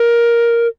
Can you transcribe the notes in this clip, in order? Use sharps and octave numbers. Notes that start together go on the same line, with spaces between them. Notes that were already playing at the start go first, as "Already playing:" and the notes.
Already playing: A#4